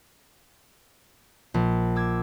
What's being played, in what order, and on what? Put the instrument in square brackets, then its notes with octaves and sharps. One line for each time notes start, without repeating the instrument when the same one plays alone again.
[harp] A#1
D6 E6 G#6